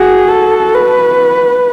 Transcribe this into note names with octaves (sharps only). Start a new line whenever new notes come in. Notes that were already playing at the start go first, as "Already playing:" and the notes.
Already playing: F#4 G#4
A4
B4